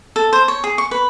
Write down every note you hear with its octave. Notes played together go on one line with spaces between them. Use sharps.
A4
C5
C#5
G#4
C#6
B4